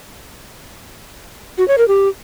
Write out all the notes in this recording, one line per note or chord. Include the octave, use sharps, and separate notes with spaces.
F#4
C#5
A#4
G4